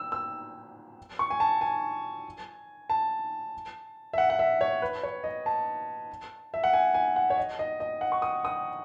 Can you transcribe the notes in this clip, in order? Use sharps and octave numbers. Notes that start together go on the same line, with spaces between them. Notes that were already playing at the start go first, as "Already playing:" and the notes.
Already playing: E6
E6
C#6
G#5
A5
G#5
A5
E5
F#5
F#5
E5
C#5
B4
C#5
D#5
A5
E5
F#5
G#5
G#5
F#5
C#5
D#5
D#5
D#5
F#5
C#6
D#6
D#6